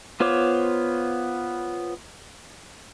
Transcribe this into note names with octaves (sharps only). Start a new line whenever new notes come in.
B3 F4 C5 C#5 D6